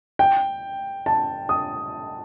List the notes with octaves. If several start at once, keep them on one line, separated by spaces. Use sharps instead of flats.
G5
A5
D#6